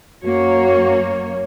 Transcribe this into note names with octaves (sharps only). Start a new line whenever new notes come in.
F#2 A#3 F#4 C#5